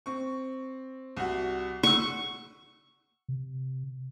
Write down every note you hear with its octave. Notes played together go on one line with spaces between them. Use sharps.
C4 C#6
C2 F#4
F#5 C#6 E6
C3